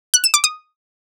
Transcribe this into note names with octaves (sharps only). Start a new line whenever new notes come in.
F#6
E7
D6
D#6